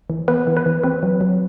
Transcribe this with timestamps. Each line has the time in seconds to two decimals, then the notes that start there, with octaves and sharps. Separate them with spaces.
0.10 E3
0.28 B3 B4
0.47 E3
0.57 B4
0.66 E3
0.84 C4 B4
1.03 F#3
1.21 F#3